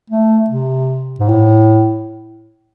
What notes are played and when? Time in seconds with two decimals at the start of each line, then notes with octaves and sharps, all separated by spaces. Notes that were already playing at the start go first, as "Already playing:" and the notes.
0.10 A3
0.50 C3
1.20 G#2
1.29 A2